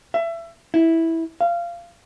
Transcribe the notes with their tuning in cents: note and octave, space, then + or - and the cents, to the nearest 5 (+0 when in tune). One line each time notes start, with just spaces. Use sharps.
E5 +25
E4 -10
F5 -20